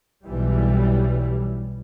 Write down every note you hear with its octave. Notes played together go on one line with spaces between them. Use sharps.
B1 E3 G3